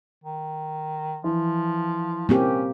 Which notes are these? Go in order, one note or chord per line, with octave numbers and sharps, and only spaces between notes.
D#3
E3 F3
A#3 C4 C#4 G4